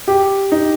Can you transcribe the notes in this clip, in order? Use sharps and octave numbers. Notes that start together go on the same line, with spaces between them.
G4
D#4